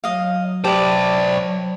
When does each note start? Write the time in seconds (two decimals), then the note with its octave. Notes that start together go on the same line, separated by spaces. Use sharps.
0.04 F#3 D#5 F5
0.65 G4 B4 C5 D5 A5